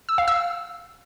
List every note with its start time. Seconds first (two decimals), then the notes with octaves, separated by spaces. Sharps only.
0.09 E6
0.18 F5
0.28 E6